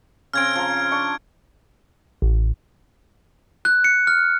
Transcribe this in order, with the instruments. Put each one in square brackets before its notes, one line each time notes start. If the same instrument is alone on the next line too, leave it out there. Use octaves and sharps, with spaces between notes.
[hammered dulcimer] C#3 C4 [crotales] F6 G#6 D7
[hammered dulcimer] F3 A#5
D4 C#6
[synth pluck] A1
[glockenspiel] F#6
C#7
F6